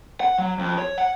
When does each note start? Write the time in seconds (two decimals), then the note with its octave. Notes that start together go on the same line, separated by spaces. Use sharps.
0.20 F#5
0.38 F#3
0.59 F2
0.78 C#5
0.98 F#5